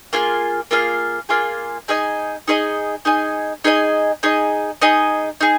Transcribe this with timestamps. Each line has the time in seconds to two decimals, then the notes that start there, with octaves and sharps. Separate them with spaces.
0.13 A#3 F4 G#4 F5
0.71 A#3 F4 G#4 F5
1.29 A#3 F4 G#4 F5
1.88 D#4 G#4 D#5 G#5
2.48 D#4 G#4 D#5 G#5
3.05 D#4 G#4 D#5 G#5
3.64 D#4 G#4 D#5 G#5
4.23 D#4 G#4 D#5
4.82 D#4 G#4 D#5
5.41 D#4 G#4